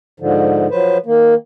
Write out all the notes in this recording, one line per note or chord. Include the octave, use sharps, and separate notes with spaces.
G#2 D3 F3
F3 F#3 B4 C5
D#3 A#3